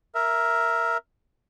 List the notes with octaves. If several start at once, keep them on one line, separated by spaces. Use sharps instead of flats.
A#4 E5